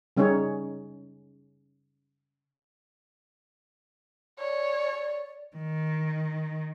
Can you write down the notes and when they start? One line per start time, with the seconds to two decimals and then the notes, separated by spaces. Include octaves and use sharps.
0.17 C#3 G3 C#4 D#4 G#4 C#5
4.39 C#5 D5
5.56 D#3